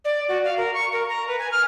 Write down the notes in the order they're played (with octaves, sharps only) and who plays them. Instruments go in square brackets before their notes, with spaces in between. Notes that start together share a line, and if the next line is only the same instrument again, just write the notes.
[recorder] D5
F#4
F5
A#4
C#6
A#4
A#5
B4
G#5
F6